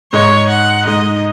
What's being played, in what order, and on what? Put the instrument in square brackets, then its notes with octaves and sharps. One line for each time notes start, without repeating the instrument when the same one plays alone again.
[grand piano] G#2 G#3 D#4 [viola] C#5
[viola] F#5
[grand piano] G#2 G#3 D#4 [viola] D#5